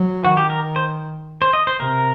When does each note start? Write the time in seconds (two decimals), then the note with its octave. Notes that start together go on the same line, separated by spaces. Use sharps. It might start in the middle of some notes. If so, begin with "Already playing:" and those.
Already playing: F#3
0.24 D#3 F#4
0.37 G4
0.50 A#4
0.76 C5
1.42 C5
1.53 D#5
1.67 C5
1.80 C3 A#4